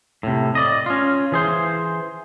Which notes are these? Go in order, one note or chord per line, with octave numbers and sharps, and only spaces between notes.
A2 C3
D5 D#5
C#4 F4
E3 G#4 C5